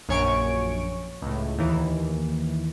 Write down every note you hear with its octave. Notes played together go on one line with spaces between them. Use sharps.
A#1 F#2 C#5 G#5 C#6 D7
C#2 A2
D#2 E3